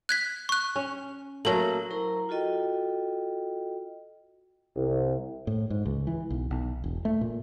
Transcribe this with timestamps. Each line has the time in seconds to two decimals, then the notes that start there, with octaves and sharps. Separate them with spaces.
0.09 F#6 G#6 B6
0.49 C#6 F#6
0.76 C#4
1.45 F#3 A3 A#3 A#4 F#7
1.90 F#3 E4 A#4 C5 A#5 C#6
2.29 F4 F#4 A4 D#5 G5
4.76 C2
5.47 A2
5.70 G#2
5.86 C#2
6.07 E3
6.30 B1
6.51 B1
6.84 E1
7.05 A3
7.21 A#2